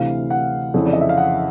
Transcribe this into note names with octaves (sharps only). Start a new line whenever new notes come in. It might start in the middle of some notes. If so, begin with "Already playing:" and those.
Already playing: D2 C3 E3 F5
F#5
F2 C#3 E3
D5
D#5
E5
F5
F#5